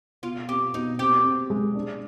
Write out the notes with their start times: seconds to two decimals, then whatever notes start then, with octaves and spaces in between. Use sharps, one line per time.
0.23 B2 F4
0.49 C4 G4
0.74 B2 D#4
0.99 C4 G4
1.24 C4
1.50 G#3
1.75 D4